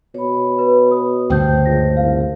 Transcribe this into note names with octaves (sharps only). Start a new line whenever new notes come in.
B2 C#5 B5
B4
D#6
D2 G2 C#3 C5 G5 A5 G6
C#2 A#6
C2 F5